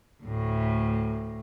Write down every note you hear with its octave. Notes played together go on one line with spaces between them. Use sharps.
D2 A2